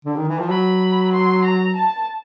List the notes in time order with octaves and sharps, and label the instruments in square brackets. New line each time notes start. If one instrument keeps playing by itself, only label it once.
[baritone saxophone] D3
D#3
E3
F3
[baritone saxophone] F#3 [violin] B5
[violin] C6
A#5
A5